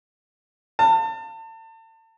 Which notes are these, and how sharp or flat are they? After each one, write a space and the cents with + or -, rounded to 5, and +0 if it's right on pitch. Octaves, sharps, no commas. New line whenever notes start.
A5 +35